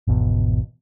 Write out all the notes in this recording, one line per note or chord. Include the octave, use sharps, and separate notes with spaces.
G#1 E2 B2